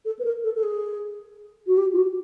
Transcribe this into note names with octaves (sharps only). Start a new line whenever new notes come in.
A4
B4
A#4
A4
A4
G#4
F#4
G4
F4
F#4